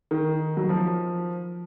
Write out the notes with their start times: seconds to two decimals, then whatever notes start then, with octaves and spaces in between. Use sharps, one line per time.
0.11 D#3
0.57 F#3
0.69 F3